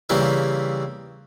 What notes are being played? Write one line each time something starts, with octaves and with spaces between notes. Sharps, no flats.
C#3 E3 G3 A#3 C4 E4